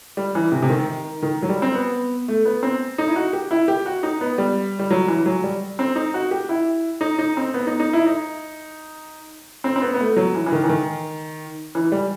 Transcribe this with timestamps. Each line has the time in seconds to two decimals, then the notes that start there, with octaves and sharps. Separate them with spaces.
0.17 G3
0.35 E3
0.52 C3
0.62 C3
0.70 D#3
1.22 D#3
1.42 F#3
1.49 G3
1.62 C4
1.75 B3
2.28 A3
2.45 B3
2.63 C4
2.98 D#4
3.08 E4
3.16 F#4
3.33 G4
3.51 E4
3.68 G4
3.86 F#4
4.03 D#4
4.21 B3
4.38 G3
4.79 G3
4.90 F#3
5.08 E3
5.26 F#3
5.44 G3
5.79 C4
5.96 D#4
6.14 F#4
6.31 G4
6.49 E4
7.01 D#4
7.19 D#4
7.37 C4
7.54 B3
7.67 D#4
7.80 D#4
7.93 E4
8.06 D#4
9.64 C4
9.76 C4
9.82 B3
9.94 B3
10.00 A3
10.17 F#3
10.35 E3
10.46 E3
10.52 D#3
10.63 E3
10.69 D#3
11.75 E3
11.92 G3